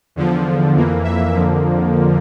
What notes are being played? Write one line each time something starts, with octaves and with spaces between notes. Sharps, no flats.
E2 D3 F3
F2 E3 A#3
E5
F2 D3 F3 A#3